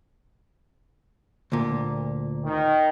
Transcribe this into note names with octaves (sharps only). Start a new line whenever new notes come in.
D2 A#2
D#3